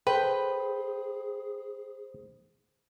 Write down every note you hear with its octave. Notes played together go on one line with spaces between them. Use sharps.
G#4 A4 B4 C5 G5